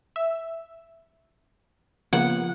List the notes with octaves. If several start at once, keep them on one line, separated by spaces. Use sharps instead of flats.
E5
C#3 F3 A#3 B3 F#5